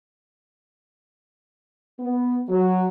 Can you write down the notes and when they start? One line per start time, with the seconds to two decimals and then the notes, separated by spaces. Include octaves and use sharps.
2.00 B3
2.49 F#3